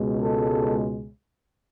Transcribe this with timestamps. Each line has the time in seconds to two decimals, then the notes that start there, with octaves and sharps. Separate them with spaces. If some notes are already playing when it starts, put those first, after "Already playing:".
Already playing: C#2 B2 G#3
0.20 A4